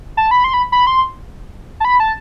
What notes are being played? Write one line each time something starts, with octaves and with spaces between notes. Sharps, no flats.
A5
B5
C6
B5
B5
C6
A5
B5
A5